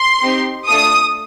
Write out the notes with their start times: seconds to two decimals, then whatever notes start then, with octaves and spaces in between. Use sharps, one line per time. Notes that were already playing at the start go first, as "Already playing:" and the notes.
Already playing: C6
0.22 C4 D#4 G4
0.68 A3 D4 F4 A4 D#6